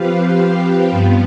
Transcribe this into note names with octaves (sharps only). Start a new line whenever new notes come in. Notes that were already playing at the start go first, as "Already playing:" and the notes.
Already playing: F3 C4 G4 B4 F5
G2 F3 B3